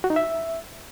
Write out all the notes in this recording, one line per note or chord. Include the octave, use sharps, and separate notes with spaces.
F#4
D#4
E5